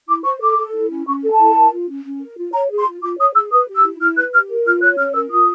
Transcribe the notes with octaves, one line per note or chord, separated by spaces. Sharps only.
E4 D6
C5 C#6
A4 D6
A4
E4
C#4
C#4 C#6
A4
A5
E4
A#4
F4
C#4
C#4
A#4
F4
C#5 A#5
G#4
C6
F4
F4 D6
C#5 D#6
G#4 E6
B4 D#6
G4
E6
E4
E4 F6
B4 F#6
G4 F6
A#4
F4 F6
C#5 F#6
C#4 F6
A#4 E6
F4 D#6